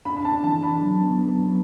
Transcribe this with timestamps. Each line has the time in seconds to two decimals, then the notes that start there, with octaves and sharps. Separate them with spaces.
0.05 D4 B5
0.17 B5
0.25 D4 A5
0.44 E3 A5
0.63 D4 B5
0.82 F#3
1.01 B3
1.20 B3
1.39 F#3